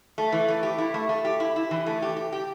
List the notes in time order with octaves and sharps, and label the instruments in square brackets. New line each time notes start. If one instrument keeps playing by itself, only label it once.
[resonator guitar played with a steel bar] A3
E3
A3
G4
E4
A3
A3
G4
E4
E4
E3
A3
G4
G4
G4